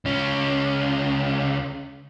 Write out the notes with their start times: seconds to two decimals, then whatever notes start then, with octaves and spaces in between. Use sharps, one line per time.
0.05 C#2 C#4